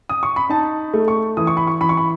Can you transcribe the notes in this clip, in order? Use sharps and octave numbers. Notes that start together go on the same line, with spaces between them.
D#6
C#6
B5
D#4 A5
A3
C#6
E3 D#6
C#6
B5
C#6
E3 B5
C#6
B5